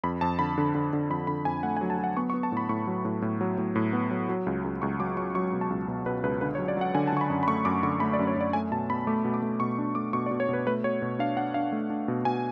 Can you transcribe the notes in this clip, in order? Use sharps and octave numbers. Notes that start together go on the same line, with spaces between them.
F2 B5
F2 A5
D3 B5
D3
D3
D3
F2 B5
D3 B5
F2 G#5
A3 F#5
G#5
F#3
A5
F#3
F#5
B3 C#6
C#6
B3
A5
A2 B5
A2 C#6
F#3
A2
A2
F#3
A2
A2
B3
F#3
F#3
C#2
C#2
C#2 C#6
F#3 D6
F#3 C#6
F#3 C#6
B2
A5
C#2
B2
B2 B4
C#2 B4
D3 B4
C#5
F#3
D5
F#3 F#5
D3 G#5
A5
D3 C#6
B5
F#2
B5
A3 C#6
F#2 D6
D3 C#6
A3 B5
D5
F#2
C#5
F#2 D5
A3 G#5
B2 A5
B2 B5
A3 D6
B2
D6
A3
B2 C#6
D4
A3 D6
B2 C#6
D5
B2
C#5
B2 B4
A3 B4
B2 C#5
B2
D4 F5
D4 F#5
D4 F5
A3
D4
B2
B2 G#5